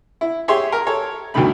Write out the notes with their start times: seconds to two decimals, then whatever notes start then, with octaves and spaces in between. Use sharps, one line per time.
0.21 E4
0.48 G4 G#4 C#5 E5 C6
0.72 A#4
0.87 A4 C#5
1.34 D2 G2 B2 D#3 A3 B5